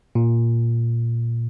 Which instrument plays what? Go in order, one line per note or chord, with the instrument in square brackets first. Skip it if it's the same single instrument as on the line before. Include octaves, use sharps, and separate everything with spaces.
[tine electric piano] A#2